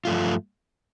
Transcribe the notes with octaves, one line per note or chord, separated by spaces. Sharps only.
G2 F3 A3 F4